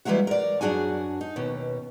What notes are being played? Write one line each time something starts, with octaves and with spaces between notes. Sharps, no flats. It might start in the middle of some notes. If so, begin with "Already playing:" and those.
E3 G3 G#3 A#3 E4 F#4
A#4 D5
F#2 D3 D4 F#4 G#4 G#5
D#4
D#2 B2 C#4